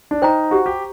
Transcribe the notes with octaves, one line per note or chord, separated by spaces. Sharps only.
D4
D#4 C5 G5 A#5
F#4 G4
G4